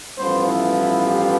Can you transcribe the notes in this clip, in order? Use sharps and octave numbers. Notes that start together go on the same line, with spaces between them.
A1 G2 F3 B3 C5
E4
E4
G4